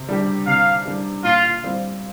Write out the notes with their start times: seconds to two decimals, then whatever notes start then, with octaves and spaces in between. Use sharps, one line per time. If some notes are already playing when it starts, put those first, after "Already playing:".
Already playing: C3
0.09 G3 D4 G4
0.47 C3 F5
0.85 G3 D4 G4
1.24 A#2 F4
1.63 G3 C4 F4